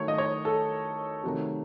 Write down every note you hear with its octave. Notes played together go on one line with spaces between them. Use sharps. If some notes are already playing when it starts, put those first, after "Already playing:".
Already playing: D#3 F#3 A3 C#5
D#5
C#5
A4
C3 D#3 F#3 A3